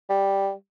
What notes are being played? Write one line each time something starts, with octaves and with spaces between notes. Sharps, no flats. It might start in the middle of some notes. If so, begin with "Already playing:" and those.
G3